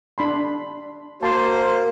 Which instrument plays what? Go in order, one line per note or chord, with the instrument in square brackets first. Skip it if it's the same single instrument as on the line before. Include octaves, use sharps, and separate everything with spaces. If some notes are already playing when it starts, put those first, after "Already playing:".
[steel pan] D4 B5 C6
[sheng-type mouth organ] A#3 [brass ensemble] F#4 C5 [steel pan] A5 C6